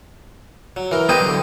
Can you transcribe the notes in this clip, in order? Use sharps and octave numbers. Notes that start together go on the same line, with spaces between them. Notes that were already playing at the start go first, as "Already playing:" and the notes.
F#3
E3 A#4
B3 G4 B4 C5 D#5 G5
D3 F#3